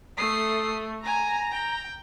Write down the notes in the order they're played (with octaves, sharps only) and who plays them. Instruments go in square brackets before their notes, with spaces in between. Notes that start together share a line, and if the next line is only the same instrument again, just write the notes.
[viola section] A3 [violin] D#6 C7
[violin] G#5 [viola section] A#5
[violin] G5